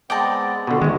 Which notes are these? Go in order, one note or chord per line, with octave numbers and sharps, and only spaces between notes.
G#3 B3 C4 D5 D#5 G5 A5
B2 D3 F4 F#4
D2 D#3 G#3